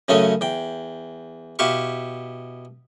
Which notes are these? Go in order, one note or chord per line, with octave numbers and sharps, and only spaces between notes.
F#2 C#3 A3 C#4 D#5 G#5
E2 G5
B2 E4 G4 F5 C#6